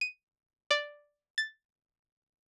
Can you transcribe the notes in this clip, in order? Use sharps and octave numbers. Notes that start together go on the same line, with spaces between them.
D#7
D5
A6